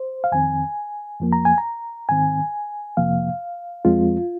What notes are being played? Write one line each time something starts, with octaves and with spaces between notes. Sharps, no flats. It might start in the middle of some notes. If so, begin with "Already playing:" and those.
Already playing: C5
F5
F2 D#3 C4 G#5
F2 F3 A#3
A#5
G#5
A#5
G#2 D#3 C4 G#5
F2 C3 F3 A#3 F5
F2 F3 G#3 C4 F4